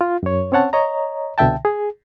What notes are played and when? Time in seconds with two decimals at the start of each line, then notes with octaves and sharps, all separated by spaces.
0.01 F4
0.23 F#2 C#5
0.52 C4 C#4 C#5 F#5 A5
0.73 C#5 D#5 A#5
1.38 C2 B2 D3 E5 G5 A5
1.65 G#4